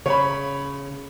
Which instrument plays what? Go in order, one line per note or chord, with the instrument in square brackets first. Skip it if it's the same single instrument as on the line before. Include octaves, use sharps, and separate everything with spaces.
[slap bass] C#3 [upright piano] C#5 B5